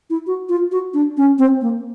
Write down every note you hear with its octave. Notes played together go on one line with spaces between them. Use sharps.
E4
F#4
F4
F#4
D4
C#4
C4
A#3